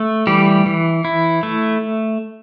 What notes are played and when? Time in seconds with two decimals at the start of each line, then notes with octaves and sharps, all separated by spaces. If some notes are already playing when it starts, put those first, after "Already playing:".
Already playing: A3
0.27 E3 G3 G4
0.66 E3
1.05 E4
1.43 A3